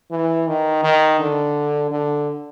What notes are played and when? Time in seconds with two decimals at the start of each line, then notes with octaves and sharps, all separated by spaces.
0.11 E3
0.48 D#3
0.84 D#3
1.20 D3
1.91 D3